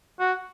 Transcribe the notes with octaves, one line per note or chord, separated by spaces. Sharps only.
F#4